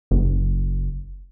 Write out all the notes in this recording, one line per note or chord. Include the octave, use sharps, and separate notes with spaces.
F#1